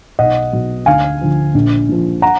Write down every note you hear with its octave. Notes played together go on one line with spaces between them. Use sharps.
B1 D#5 F#5
B2 F#3
D2 F5 G#5
D3 F3
A#1
A#2 F3
F#5 A#5